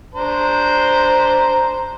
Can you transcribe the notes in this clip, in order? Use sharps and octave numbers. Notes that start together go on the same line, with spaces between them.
D4 C5 A#5